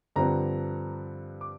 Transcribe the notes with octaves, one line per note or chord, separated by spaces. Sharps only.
G2 D3 F3 C4 A#5
D6